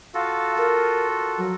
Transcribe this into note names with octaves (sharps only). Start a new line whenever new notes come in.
F4 F#4 A4 F5
A#4
F#3